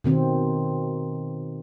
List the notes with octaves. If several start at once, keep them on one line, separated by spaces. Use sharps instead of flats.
B2 D#3 C4